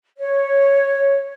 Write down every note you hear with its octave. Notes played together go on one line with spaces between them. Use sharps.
C#5